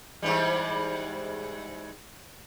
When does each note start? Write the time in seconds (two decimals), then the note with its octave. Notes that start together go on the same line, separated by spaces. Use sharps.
0.22 G#2 E3 G3